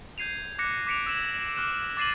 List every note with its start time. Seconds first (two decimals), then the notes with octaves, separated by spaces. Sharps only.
0.18 G6 G#6 C7 D#7 F7
0.59 D6 F#6 A#6 C#7
0.87 D6 B6 C#7 D7 F7
1.06 E6 G#6 C#7 E7 F#7
1.56 D6 F6 F#6 E7
1.97 D6 A6 C7 D#7 F#7